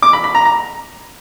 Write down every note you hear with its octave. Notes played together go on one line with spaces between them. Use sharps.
D6
B5
B5
A#5
A#5